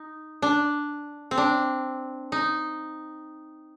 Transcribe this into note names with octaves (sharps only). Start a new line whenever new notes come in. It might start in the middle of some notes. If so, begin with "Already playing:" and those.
Already playing: D#4
D4
C4
D4
D#4